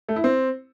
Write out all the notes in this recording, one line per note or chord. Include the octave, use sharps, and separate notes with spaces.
A3
E4
C4